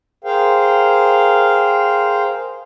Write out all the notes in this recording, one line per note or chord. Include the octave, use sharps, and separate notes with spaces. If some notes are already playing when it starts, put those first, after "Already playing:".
G#4 A#4 C5 F5 G5